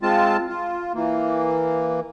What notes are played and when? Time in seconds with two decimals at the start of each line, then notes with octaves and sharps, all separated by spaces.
0.03 G#3 C4 F4 A5
0.48 F4
0.94 E3 A#3